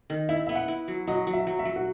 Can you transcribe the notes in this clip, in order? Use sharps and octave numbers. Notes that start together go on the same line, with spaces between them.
D#3
E4 E5
B3 E5
F#5
E4
F#3
F#3 D#5
F#3
E5
F#3
E5
F#3
F#4